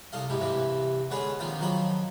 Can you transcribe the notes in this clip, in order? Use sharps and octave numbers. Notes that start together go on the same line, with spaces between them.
C2 A4 D#5 F5
G#2 B2 E4 G4
G2 C3 E3 C4 E4
D3 G#3 B3 C#4 G#4 B4
A#1 D#3 C4 F4 C5
D#3 F3 F#3 C5 B5 D6